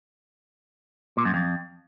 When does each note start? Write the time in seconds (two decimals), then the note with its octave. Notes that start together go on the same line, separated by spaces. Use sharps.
1.17 A#2
1.25 F#2
1.34 F2